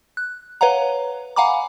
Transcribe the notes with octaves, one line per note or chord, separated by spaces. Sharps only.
F#6
B4 C#5 F5 F#5 A#5
F5 F#5 G#5 A#5 B5 D6